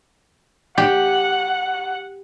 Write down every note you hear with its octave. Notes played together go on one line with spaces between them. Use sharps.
G4 F#5